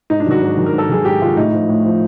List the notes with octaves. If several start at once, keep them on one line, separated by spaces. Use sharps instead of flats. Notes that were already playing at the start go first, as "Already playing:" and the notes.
G#2 D#4
D4
D#3 F#3 F#4
G#2
D#3 F#3
A#4
G#2
A4
D#3 F#3 G#4
G#2 G4
D#3 F#3 F4
A2 D#4
F3
A2
F3